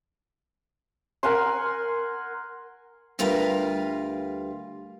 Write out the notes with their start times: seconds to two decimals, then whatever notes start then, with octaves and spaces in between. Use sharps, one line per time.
1.23 A#4 F#5 G#5 C6
3.19 D2 G3 F4 A#4 B4 F5